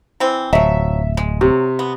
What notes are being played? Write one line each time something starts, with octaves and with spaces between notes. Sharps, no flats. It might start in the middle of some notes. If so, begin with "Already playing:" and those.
E3 C4
D1 F3 F#3 E5
G#3
C3 F#3
B3